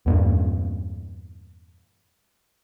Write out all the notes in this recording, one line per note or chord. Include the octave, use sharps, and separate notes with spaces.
E2 G2 A#2